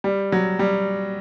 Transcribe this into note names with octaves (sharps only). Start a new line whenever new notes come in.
G3
F#3
G3